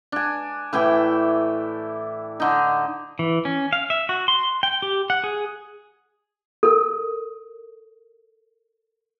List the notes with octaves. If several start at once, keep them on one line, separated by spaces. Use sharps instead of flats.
D4 G#5
A2 E3 E4 G5
D3 D#4
E3
C#4
F5
E5
F#4
C6
G5
G4
F#5
G#4
A4 A#4